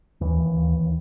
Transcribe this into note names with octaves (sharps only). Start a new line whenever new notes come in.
D#2 E3
D#2
D#2
D#2